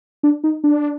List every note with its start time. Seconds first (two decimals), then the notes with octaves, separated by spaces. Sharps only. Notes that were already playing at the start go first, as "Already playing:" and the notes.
0.23 D4
0.44 D#4
0.64 D4